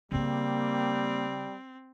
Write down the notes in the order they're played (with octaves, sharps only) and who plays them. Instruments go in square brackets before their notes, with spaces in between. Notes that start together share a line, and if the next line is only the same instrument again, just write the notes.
[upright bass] C#3 D#4 [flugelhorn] G3 [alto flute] A#3 [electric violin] C4